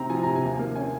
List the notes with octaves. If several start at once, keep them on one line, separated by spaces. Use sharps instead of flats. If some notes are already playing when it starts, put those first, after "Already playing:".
Already playing: C3 C4 A#5
F3 G#5
C3 A#5
G#5
D#2
A#3
C#4 G#5